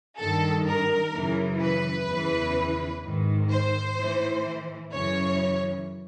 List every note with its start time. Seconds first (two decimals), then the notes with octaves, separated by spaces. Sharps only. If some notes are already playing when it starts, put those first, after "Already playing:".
0.19 G2 D#3 A4
0.66 A#4
1.14 F#2 C#3 E3
1.61 B4
2.08 E2 C#3 E3
3.04 G#2 D#3
3.50 C5
3.97 A2 E3
4.92 F#2 C#3 E3 C#5